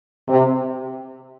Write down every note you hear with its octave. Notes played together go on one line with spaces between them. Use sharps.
C3